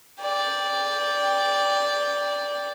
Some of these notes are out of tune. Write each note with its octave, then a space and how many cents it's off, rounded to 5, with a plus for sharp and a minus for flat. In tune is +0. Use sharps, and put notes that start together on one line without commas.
D5 -10 G5 +10